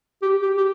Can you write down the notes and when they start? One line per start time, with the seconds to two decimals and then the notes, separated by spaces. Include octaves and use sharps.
0.22 G4
0.42 G4
0.57 G4